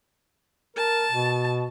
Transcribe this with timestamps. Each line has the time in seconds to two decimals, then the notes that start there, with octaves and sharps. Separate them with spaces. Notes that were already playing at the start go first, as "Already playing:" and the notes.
0.77 A#4 A5
1.11 B2